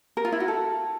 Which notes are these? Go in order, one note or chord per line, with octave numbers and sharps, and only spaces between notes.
A#4
F4
E4
F#4
A4